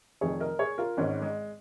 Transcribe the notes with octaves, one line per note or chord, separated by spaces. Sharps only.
F1 F2 D#3 G#4 C#5
A#4 D#5
G#4 C#5
F4 A#4
G#1 G#2 D#3 G#3 C#4
G#3